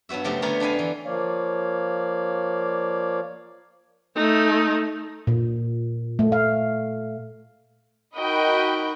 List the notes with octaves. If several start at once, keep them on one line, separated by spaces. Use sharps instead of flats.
G2 F#3 B3 F#4 E5
C#3 F3 F#3 A3 G4
D3 A3 B3 G4 A#4 C#5
F2 D4 B4 F5 G#5
E3
F3 A#3 C#5 D5 F5
A3 D#4
A#2
A3
F5
D#4 F#4 A#4 D#5 G5 B5